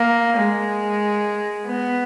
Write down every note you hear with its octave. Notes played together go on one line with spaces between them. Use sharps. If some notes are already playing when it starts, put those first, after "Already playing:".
Already playing: A#3
G#3
B3